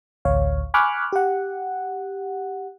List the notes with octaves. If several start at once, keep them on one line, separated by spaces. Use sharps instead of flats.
A1 D2 C#5 F5
G#5 B5 C#6 D6 F6 F#6
G4 F#5